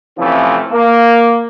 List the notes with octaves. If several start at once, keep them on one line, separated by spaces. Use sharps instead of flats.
C3 E3 F3 A3 C4 C#4
A#3